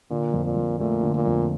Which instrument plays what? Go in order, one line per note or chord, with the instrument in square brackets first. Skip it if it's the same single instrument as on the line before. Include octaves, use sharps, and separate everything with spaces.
[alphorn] A#2 [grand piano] D3
[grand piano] F2
[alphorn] A#2
[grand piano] F2
[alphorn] A#2 [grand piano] A3
[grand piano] D3
[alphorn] A#2
[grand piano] F2